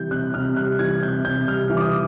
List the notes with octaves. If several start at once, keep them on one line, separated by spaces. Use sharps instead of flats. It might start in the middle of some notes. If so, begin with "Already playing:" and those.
Already playing: C3 E3 G3 G6
C3 F#6
C3 F6
G3 F#6
E3 G#6
C3 G6
C3 G6
G3 F6
E3
D6
D#6